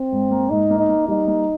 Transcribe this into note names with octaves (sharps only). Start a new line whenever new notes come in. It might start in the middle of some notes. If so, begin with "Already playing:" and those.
Already playing: C4
G#2
A#3
G#2 D#4
A#3
D#4
A#3
G3 D#4
A#3